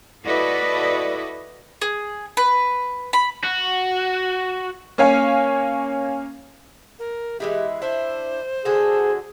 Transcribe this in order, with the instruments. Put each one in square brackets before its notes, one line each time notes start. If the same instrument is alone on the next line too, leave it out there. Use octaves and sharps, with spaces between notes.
[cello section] E4 F#4 A4 B4 D5 D#5
[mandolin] G#4
B4
B5
[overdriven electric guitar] F#4
[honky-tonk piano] A#3 C#4 C#5 F5 G#5
[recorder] A#4
[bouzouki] E3 G#3 E4 [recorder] G4
[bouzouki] D4 E4 E5 [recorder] C5
[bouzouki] D3 F#4 A4 [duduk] G#4